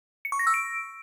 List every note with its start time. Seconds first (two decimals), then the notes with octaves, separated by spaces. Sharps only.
0.25 C#7
0.32 C#6
0.39 A#6
0.47 E6
0.54 D7